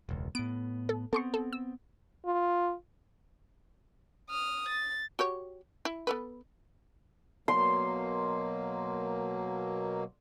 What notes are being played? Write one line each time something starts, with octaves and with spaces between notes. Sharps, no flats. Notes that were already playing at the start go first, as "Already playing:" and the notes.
E1 C#2
A2 B3 D7
A4
B3 C4 A4 C6 C#6
A4
E6
F4
D#6 F6
A6
F#4 G4 C#5
E4
B3 A4 B4
B2 F#3 A#3 C6